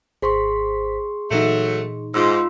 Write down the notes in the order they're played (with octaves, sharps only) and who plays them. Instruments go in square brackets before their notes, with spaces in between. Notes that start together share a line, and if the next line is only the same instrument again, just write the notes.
[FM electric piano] G#1 C5 B6 [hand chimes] G#4 C6 C#6
[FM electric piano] A#2 E3 D#4 [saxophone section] F#3 A3
[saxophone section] G#2 [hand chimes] F4 C6 E6